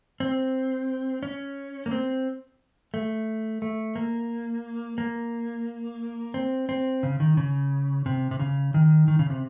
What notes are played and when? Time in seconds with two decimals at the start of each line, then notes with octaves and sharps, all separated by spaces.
0.20 C4
1.23 C#4
1.86 A#3
1.91 C4
2.94 A3
3.62 A3
3.96 A#3
4.98 A#3
6.34 C4
6.69 C4
7.03 C#3
7.20 D#3
7.37 C#3
8.06 C3
8.31 C3
8.40 C#3
8.74 D#3
9.08 D#3
9.19 C#3
9.30 C3